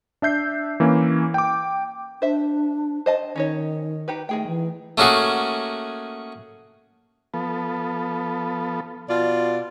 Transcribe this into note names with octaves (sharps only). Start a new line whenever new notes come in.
D4 E5 G6 C7
E3 A#3 C#4
G5 D6
D4 C5 E5
C5 D#5 A5
D#3 C#4 D#4 C#5
D#4 G4 B4
D#3 A3 G#4 G5
E3
A3 A#3 C#4 F#4 G#4
F3 B3 A4
B2 F4 D5